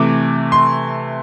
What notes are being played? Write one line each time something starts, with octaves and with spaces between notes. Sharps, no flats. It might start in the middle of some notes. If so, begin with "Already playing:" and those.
Already playing: C3 E3 A3 D6
C6